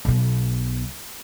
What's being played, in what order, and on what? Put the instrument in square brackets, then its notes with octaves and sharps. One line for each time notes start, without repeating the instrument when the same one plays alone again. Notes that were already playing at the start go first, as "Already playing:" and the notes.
[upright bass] B1 B2